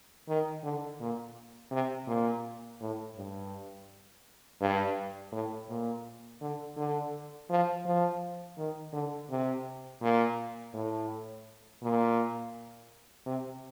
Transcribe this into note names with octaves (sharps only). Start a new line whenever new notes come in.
D#3
D3
A#2
C3
A#2
A2
G2
G2
A2
A#2
D3
D3
F3
F3
D#3
D3
C3
A#2
A2
A#2
C3